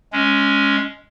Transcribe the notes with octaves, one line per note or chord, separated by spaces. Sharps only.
G#3 C#4